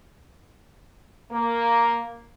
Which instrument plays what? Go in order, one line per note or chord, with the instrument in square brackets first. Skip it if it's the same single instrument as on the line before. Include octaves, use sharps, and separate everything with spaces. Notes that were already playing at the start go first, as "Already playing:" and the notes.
[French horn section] A#3